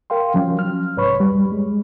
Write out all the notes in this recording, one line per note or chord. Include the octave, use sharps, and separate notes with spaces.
A#4 F5 G5 C6
F3 F#3 C#4
F6
C2 G#2 B4 C#5 B5 C#6
F2 G3
G#3